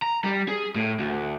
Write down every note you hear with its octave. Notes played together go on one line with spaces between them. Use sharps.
A#5
G3
G#4
A2
D2